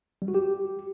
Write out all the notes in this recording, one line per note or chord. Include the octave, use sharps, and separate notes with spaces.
G3
F#4
G4